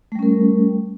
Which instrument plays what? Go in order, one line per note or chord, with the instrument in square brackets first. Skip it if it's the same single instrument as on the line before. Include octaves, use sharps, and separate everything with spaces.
[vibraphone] A3
G3
C#4
A#4